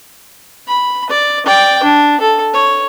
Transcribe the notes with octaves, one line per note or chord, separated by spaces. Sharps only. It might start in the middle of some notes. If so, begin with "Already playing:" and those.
B5
D5
D5 G5
D4
A4
C#5